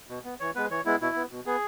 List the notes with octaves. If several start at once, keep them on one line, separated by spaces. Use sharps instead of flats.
B2
B3
E3 C#5
G#3 B3 B4
E3 C#5
G#3 B3 E4
B2 E4
B3
B2
B3 G#4